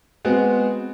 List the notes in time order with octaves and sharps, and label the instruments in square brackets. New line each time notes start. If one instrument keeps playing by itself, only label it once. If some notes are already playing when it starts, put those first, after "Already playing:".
[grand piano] G#3 B3 C4 F#4